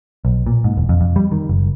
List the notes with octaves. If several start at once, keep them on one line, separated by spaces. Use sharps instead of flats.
B1
A#2
G#2
E1
F2
F2
G3
D#3
F#1